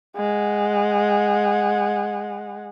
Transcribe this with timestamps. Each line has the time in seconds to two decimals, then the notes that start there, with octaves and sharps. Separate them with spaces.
0.16 G#3 F#5